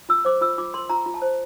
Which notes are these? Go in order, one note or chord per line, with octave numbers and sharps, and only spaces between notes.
F4 E6
C5 D6
F4 E6
F4 D6
A#4 C6
F4 A#5
F4
A5
C5